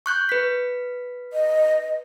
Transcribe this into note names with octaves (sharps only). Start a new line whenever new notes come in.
C#6 F#6 G6
B4 B6
D#5